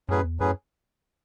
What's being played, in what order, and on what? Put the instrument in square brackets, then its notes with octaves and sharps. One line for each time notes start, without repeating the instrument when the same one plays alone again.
[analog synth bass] F#2 [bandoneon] A2 F#3 C#4 G#4 B4
[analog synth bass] E2
[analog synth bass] F#2 [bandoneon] A2 F#3 C#4 G#4 B4